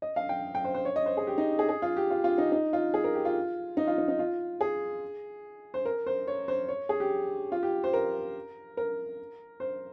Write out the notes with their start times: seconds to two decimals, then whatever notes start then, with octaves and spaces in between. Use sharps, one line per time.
0.02 D#5
0.16 F5
0.29 G5
0.55 G5
0.64 C5
0.74 C5
0.85 C#5
0.96 D#5
1.06 C5
1.17 G#4
1.27 G4
1.38 D#4
1.59 G#4
1.69 G#4
1.82 F4
1.97 G4
2.10 F4
2.24 F4
2.38 D#4
2.52 D#4
2.73 F4
2.94 G#4
3.04 A#4
3.14 G4
3.25 F4
3.77 D#4
3.87 F4
3.98 D#4
4.08 D#4
4.19 F4
4.61 G#4
5.74 C5
5.85 A#4
6.06 C5
6.27 C#5
6.48 C5
6.68 C#5
6.89 G#4
7.00 G4
7.52 F4
7.63 G4
7.84 C5
7.93 A#4
8.77 A#4
9.60 C5